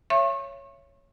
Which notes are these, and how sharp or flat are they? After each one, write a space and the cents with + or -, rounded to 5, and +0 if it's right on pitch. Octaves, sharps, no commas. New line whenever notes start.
C#5 +0 E5 +35 C#6 -35